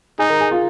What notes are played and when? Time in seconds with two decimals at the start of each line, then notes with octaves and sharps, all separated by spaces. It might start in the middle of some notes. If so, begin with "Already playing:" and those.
0.18 D#4 G#4 G#5
0.30 A#4 A#5
0.40 G#4 G#5
0.51 F4 F5